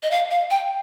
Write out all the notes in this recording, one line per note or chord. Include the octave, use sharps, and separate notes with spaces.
D#5
F5
F5
G5